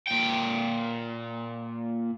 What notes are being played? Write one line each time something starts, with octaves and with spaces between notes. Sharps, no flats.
A#2 G5